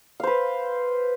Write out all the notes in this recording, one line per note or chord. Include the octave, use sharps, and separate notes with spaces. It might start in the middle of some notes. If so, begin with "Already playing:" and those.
B4 C5 F5